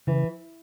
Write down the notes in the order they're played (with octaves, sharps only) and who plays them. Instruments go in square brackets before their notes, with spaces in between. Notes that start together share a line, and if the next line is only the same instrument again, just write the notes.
[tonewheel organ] C#3 [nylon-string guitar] E3